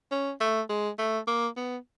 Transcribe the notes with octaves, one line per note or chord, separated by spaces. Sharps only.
C#4
A3
G#3
A3
A#3
B3